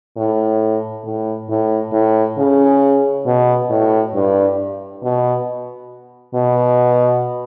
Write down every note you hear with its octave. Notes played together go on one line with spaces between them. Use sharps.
A2
A2
A2
A2
C#3
B2
A2
G2
B2
B2